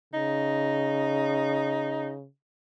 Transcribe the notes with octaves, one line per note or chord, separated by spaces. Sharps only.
C#3 D#4